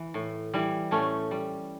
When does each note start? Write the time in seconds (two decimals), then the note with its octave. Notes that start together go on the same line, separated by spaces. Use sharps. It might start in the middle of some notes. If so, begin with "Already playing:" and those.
Already playing: E3
0.14 A2
0.54 E3 G3
0.91 A2 A3 C#4
1.31 G3